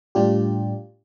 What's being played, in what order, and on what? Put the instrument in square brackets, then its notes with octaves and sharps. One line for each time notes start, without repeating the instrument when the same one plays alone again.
[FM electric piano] A2 G3 D4 F4 G4